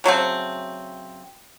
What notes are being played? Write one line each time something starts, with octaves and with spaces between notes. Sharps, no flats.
C#3 F#3 A3 C4